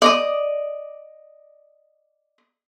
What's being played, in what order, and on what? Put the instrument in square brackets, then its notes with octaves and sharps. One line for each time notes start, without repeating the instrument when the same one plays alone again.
[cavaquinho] D5 D#5 D#6